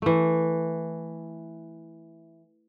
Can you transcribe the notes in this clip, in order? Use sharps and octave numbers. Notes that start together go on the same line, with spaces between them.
E3 A3